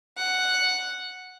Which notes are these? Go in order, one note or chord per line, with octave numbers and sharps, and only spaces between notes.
F#5